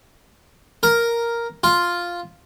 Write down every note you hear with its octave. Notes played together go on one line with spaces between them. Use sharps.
A#4
F4